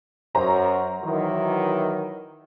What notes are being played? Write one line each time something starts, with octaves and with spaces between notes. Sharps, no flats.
F#2 C5 A#5
D#3 E3 F#3